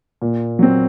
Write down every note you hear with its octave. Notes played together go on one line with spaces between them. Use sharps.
A#2
F#3 C4